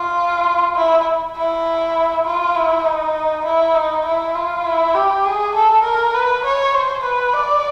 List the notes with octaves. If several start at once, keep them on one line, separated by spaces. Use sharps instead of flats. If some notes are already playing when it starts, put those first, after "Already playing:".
Already playing: F4
E4
E4
F4
E4
D#4
E4
D#4
E4
F4
E4
G4
G#4
A4
A#4
B4
C#5
C5
B4
D5